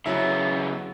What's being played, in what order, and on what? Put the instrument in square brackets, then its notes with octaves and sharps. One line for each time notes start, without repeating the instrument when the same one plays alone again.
[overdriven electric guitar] C#3 B3 [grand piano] F#3 E4